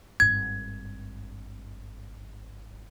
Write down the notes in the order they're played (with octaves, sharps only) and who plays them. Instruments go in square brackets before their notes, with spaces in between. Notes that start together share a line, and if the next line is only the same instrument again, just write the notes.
[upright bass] G#1 G2 [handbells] G#6